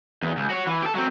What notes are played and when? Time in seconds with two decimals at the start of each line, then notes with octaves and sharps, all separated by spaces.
0.23 E2
0.37 C#2
0.50 F#4 C#5
0.67 E3
0.83 G4 A4
0.95 F#3 C4